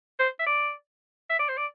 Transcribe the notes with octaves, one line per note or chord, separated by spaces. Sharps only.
C5
E5
D5
E5
D5
C5
D5